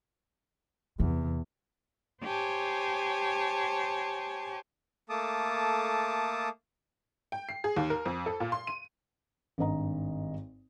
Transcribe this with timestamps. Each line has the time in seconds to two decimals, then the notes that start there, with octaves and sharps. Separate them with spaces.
1.00 E2 C3
2.24 G4 C5 C#5 G#5 A5
5.10 A3 A#3 A4 A5 D6 D#6
7.32 G5
7.49 C7
7.64 G#4
7.76 D#2
7.90 A#4
8.05 F2
8.26 A4
8.40 A#2
8.52 C6
8.67 D#7
9.58 G#1 G2 D#5 A#5